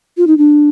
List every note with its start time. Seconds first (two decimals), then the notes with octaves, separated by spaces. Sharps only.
0.17 F4
0.27 D#4
0.38 D4